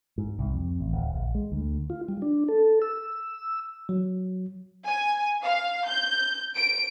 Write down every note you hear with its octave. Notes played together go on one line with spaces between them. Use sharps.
G#2
C2
F2
A1
D1
A#1
G#3
D2
F4
G3
D4
A4
E6
F#3
G#5
F5
G6
D7